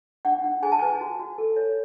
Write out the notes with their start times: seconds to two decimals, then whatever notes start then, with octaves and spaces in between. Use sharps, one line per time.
0.25 D4 F#5
0.44 D4
0.63 G#4 G#5
0.72 A5
0.79 B4 G#5
1.01 F#4
1.19 F#4
1.38 A4
1.56 C#5